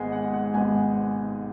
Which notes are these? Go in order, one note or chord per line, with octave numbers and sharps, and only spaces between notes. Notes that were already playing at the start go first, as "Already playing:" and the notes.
Already playing: G#1 G#2 G#3 B3 G#5
F#5
F#5
G#1 G#2 G#3 B3 G#5